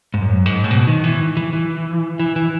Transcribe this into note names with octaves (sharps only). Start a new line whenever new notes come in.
G#2
F#2
G#2
A2
B2
D#3
E3
E3
E3
E3
E3